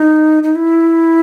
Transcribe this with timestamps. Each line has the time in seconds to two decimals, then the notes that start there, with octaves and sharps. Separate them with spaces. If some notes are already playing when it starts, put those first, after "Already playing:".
Already playing: D#4
0.43 D#4
0.55 E4